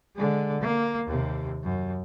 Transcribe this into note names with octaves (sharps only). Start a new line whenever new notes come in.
D3 G#3
A#3
D#2 C3
F#2